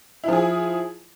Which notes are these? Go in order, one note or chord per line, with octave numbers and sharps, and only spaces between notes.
F3 E4 G#4